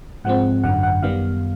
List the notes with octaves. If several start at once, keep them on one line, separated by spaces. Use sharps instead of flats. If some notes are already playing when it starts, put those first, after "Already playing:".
G#2 F3 G#3 C4 F#5
G#1 F#2 D3 F#3 F#5
F#5
F#2 D#3 G3 B3 F5